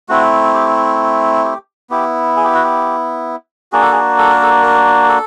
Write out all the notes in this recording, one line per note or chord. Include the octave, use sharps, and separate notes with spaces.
A3 C4 E4 F#4
G4
G4
B3 E4 G4
G#4
G4
F#4
G4
A#3 D4 F#4 G#4
A4
G#4
A4
A#4
A4
A#4
A4